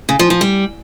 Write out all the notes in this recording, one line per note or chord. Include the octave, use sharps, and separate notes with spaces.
C#3
F3
F3
G3